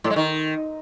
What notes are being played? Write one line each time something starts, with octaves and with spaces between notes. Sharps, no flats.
A2
G#3
D#3